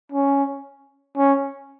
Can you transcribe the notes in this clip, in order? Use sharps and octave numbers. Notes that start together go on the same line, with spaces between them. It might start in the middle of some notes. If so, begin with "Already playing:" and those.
C#4
C#4